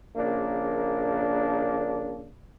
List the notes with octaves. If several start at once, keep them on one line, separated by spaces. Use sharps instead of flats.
A#1 C#3 A#3 D4